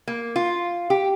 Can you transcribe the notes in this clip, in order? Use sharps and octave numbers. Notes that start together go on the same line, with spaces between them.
A#3
F4
G4